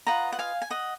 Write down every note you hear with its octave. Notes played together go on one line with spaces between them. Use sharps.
F4 B4 D#5 F#5 A#5
F#5
F5 G#5
G#5
D#5 F#5